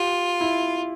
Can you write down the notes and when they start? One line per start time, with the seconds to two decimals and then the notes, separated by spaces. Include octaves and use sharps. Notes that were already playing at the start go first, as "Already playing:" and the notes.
Already playing: F4 G4
0.41 E4